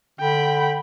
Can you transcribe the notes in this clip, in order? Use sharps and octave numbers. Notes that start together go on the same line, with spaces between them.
D3 G5 B5